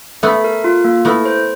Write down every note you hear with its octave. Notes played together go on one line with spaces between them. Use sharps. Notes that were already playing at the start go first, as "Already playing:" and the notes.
A3 B3 E5
A#4
F4
A#3
A3 B3 E4
C5